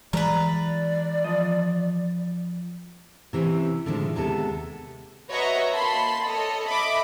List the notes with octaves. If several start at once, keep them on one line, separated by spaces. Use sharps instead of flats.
E3 F#3 G#3 B4 D5 A#5
F3 D#5
C3 E3 C4 C#4
A2 D3 D#3 F3 G#3
D#2 C3 G#3 B3 A4
F#4 B4 C#5 D#5 E5 A#5
A#3 A5 B5 C6
A4 C#5 D#5
D#5 E5 B5 D6